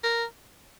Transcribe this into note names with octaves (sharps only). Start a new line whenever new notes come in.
A#4